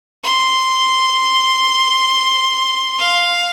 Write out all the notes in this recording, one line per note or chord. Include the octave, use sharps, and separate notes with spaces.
C6
F5